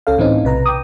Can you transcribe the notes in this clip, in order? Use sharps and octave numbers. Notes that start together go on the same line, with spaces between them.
C#2 C#4 A4 F5
A2 E3 C4 C#4 D#4
B1 C3 B4 A#5
G5 D6 D#6